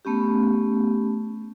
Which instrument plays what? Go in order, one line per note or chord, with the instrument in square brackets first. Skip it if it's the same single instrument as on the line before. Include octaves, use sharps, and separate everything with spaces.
[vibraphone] A3 B3 C#4 G4